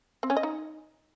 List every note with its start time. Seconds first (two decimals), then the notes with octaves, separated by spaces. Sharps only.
0.23 C4
0.30 C#4
0.37 D#5
0.43 D#4